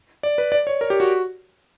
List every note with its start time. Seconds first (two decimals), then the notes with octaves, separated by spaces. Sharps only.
0.23 D5
0.38 B4
0.52 D5
0.67 C#5
0.81 A#4
0.90 G4
1.00 F#4